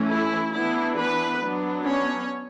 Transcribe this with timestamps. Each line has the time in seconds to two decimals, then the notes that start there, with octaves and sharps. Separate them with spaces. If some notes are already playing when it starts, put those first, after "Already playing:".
Already playing: E3 A3 C#4
0.10 E4
0.54 E3 B3 D4 E4
0.98 B3 B4
1.41 F#3 B3 D4
1.85 C#4 C#5